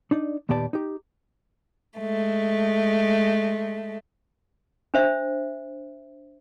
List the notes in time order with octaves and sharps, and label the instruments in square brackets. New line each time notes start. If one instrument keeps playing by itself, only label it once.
[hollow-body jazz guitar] D4 D#4 D5
D#2 A#2 B3 G4 D5 A5
D#4 G4
[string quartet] G#3 A3
[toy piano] D4 C5 E5